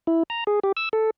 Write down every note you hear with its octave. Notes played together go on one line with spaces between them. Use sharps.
E4
A#5
G#4
G4
E6
A4